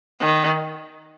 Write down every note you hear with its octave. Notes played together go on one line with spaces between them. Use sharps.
D#3